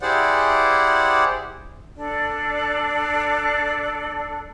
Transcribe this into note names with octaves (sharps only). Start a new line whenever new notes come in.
E4 G4 G#4 C5 D5 F#5
D4 A4 D5